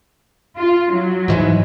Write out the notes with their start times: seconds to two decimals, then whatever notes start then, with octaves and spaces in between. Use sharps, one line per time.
0.59 F4
0.91 F#3
1.28 G#2 E3 G#3